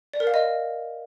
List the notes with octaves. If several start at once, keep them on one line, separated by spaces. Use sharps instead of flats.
D5
A#4
F5
D#5